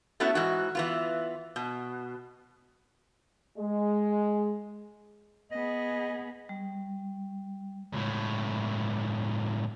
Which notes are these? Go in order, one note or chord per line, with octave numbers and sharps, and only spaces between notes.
A3 B3 C#4 E4 F#4
G#2 E3 F#4
E3 B3 F4
B2
G#3
B3 G#4 D#5
G3
C#2 A2